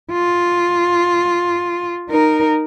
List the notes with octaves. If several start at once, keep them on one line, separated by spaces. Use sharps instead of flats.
F4
D#4 A#4